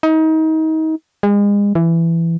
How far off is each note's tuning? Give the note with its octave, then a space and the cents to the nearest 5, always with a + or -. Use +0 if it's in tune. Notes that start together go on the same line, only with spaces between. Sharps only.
D#4 +30
G#3 -35
E3 +15